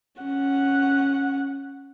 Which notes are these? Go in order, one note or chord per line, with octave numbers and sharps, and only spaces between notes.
C#4 F#5